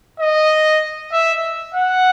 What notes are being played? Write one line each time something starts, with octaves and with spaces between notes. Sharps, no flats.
D#5
E5
F#5